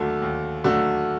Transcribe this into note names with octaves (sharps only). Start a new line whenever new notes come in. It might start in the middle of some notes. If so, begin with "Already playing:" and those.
Already playing: D#2 D3 F#3 A3
D#2
D3 F#3 A3